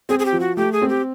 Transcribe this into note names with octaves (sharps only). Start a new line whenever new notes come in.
C4 G#4
G#4
G4
F3
F#4
A3 G4
G#4
C4
G4